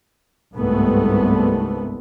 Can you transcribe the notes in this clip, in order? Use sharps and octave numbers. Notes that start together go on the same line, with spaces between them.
G1 C2 G#2 A3 B3